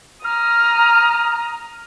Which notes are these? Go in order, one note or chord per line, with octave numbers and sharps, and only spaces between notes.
A#5 D#6 F6